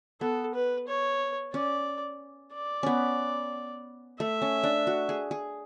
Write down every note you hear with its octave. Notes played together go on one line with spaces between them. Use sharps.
B3 A4
B4
C#5
C#4 D5
D5
B3 C#4
A3 E5
C#4
D4
F#4
G#4
G#4